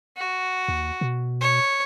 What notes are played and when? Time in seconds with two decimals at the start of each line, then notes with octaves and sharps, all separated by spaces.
0.17 F#4
0.68 D#2
1.01 B2
1.41 C#5